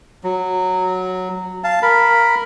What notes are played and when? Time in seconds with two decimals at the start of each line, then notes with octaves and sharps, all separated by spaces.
0.24 F#3
1.64 F5 A5
1.82 A#4 B5